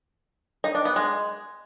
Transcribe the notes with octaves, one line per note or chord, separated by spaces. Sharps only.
D#4
D4
B3
G#3